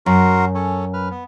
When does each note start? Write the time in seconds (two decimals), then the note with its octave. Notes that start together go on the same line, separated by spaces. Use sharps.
0.06 F#2 F#4 A#4 C6
0.55 C#4 A4 C#5
0.94 B4 F6
1.11 B3